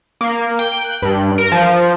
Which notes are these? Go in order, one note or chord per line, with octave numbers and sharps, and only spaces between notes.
A#3
G5
F#6
G2
A#4
F3